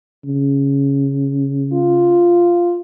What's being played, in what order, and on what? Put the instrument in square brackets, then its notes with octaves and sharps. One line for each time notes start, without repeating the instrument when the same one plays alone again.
[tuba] C#3
[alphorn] F4